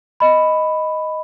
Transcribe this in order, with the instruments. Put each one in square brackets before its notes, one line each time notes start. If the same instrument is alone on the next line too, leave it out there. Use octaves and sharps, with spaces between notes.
[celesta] D#5 B5